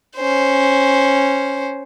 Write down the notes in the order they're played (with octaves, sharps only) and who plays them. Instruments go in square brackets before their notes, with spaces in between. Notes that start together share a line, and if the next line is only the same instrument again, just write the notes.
[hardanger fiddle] C#4 C5